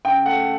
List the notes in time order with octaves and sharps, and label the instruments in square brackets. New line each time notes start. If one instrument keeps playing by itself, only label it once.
[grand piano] C#3 G5
A3 F#5